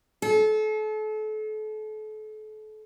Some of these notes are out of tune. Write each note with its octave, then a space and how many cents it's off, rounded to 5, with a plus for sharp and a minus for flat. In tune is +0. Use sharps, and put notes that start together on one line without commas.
A4 -35